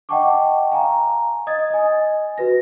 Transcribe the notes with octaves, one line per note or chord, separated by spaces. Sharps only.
D#5 F#5 G5 A5 C#6 D6
F5 G#5 A#5
D#5 D#6 G#6 A6
D#5 G#5
F#4 B4 A#6